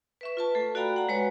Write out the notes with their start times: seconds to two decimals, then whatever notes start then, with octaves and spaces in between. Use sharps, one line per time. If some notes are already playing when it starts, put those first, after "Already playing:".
0.21 B4 E5 C#6
0.37 F4 B4 A5
0.55 A3 A4
0.75 F#4 D5 F5 G5 A#5 B5
0.96 F#5 A#5
1.09 G#3 F#4 B4 C#5